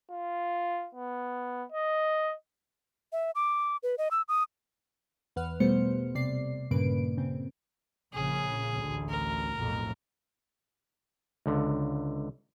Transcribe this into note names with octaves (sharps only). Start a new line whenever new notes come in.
F4
B3
D#5
E5
D6
B4
D#5
E6
D#6
E2 B4 F#5 F6
B2 G3 A3 B3 C5 C#7
C3 D5 C7
G2 A#2 C#3 A#3 B4 D7
C#3 C4
A#1 C#3 G#4
A1 D2
A#4
B1 F2 A2
C#2 D3